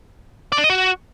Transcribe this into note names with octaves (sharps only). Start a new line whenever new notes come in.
D5
D4
D#5
F#4